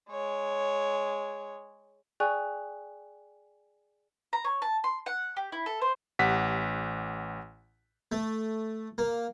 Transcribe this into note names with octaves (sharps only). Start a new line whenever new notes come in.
G#3 C#5
G#4 D5 G5 G#5 C#6 F#6
A#5
C#5
A5
C6
F#5
G4
E4
A4
C5
A1 G4 F#5 B6
A3
A#3